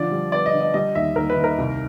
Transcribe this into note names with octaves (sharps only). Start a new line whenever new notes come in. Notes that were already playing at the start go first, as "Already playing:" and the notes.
Already playing: D3 F3 D5
G3
B3 D5
D#5
D3
D#5
G3 D#5
D#2 E5
D#2 A#4
B4
D#2
A#4
C2